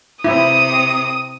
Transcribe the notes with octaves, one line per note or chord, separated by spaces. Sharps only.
C3 E4 A#5 D#6